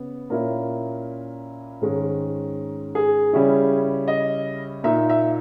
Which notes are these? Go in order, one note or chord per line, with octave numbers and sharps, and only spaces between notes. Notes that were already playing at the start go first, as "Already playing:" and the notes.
Already playing: C#3 B3
A#2 A#3 C#4 E4 A#4
G#2 D#3 G#3 C#4
G#4
C#3 G3 C#4 E4
D#5
A#2 A#3 D#4 E5
E5